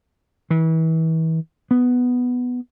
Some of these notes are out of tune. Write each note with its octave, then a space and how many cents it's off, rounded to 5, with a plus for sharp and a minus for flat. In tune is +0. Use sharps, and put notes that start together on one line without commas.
E3 -35
B3 +5